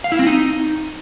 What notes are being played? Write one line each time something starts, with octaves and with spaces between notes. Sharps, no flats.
F5
E4
C4
D#4